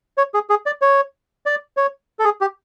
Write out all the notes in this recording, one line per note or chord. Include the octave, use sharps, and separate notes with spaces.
C#5
G#4
G#4
D5
C#5
D5
C#5
A4
G#4
G4